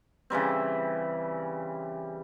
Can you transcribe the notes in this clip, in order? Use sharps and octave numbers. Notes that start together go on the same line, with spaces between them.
C#3 E3 G3 C4